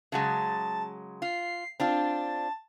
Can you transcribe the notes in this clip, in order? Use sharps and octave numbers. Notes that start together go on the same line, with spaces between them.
C#3 F#3 G#3 A5
F4 C7
C4 D4 F4 A5